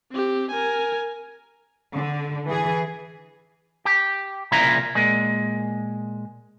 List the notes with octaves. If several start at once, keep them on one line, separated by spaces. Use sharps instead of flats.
C4 G4
A#4 G#5
D3
E3 G#4
G4
C2 A#2 C#3 F3 E4 A#5
A#2 G#3